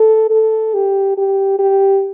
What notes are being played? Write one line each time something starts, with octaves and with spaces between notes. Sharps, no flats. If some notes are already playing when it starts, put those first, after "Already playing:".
Already playing: A4
A4
G4
G4
G4